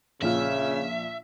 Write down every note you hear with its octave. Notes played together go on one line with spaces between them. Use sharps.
A#1 C#3 F4 E5 F6